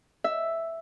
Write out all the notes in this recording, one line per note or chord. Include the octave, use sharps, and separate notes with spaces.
E5